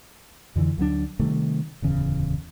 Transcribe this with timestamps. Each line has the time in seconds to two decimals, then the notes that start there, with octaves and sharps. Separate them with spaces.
0.56 F2 D3 E3
0.78 D2 F#3 A3 D4
1.19 C3 D#3 G3 A3
1.82 D1 E2 C#3